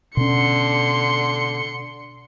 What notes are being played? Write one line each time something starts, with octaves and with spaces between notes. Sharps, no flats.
B2 D3 C#4 C6 C#7